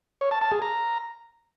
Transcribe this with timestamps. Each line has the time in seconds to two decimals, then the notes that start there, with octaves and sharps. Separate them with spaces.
0.21 C#5
0.31 A5
0.41 A5
0.52 G#4
0.62 A#5